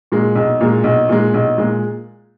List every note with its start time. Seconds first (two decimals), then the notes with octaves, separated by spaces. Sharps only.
0.12 A#2 G#3
0.35 B1
0.60 A#2 G#3
0.84 B1
1.09 A#2 G#3
1.34 B1
1.58 A#2 G#3